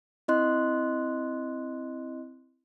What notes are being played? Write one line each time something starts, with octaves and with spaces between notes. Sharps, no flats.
C4 E4 D#5 C6 F#6